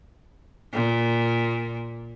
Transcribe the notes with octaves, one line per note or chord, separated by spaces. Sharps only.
A#2